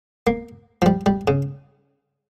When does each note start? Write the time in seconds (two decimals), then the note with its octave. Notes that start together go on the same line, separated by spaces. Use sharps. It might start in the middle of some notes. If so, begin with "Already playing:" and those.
0.27 A#3
0.82 F3
0.86 G3
1.06 G3
1.28 C#3